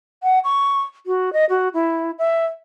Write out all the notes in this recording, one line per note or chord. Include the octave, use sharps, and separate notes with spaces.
F#5
C#6
F#4
D#5
F#4
E4
E5